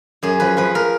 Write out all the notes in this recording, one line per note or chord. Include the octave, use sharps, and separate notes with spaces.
F#2 G#4
F3 B4
F3 B4
A#4